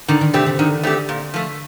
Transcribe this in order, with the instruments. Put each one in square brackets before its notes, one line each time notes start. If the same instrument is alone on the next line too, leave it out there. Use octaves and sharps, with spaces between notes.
[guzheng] D3 [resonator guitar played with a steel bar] D#3
[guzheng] D#3
[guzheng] C3 [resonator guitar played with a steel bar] A3 C4 G4
[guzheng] D3
[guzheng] D3 [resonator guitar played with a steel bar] D#3
[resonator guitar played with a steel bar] A3 C4 G4
A#2
F3 A3